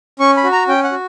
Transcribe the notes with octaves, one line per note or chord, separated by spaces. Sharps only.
C#4 C#6
B5
F#4
A#5
C#4 G5
F#5
F#4